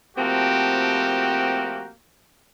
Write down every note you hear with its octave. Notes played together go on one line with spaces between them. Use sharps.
F3 A3 A#3 C4 F#4 G4